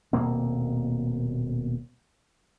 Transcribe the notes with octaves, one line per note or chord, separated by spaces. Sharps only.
D#1 B2 A#3 C4